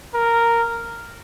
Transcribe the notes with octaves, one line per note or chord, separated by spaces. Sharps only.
A#4